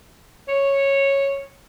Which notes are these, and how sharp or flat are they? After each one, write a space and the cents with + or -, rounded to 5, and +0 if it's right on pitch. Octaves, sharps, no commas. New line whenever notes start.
C#5 -10